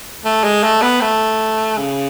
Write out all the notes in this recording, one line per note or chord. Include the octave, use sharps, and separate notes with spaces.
A3
G#3
A3
B3
A3
C#3